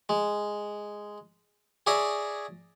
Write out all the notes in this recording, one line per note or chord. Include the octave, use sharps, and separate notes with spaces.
G#3
G#4 C#5 D5 E5 A#5